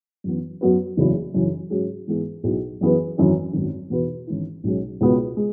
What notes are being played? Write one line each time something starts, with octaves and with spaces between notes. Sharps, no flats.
F#2 E3 B3
F#2 F#3 B3 F#4 B4
F#1 E2 C#3 F#3 E4
F#2 C#3 E3 C#4
G#2 F#3 C#4 G#4
G#2 E3 B3 E4 G#4
B1 B2 B3 E4 G#4
F#2 E3 B3 G#4 B4
G#1 F#2 E3 C#4
G#1 F#2 F#3
E2 B2 B3 F#4 B4
G#1 G#2 E3 C#4 E4
B1 B2 G#3 C#4
C#2 B2 B3
G#3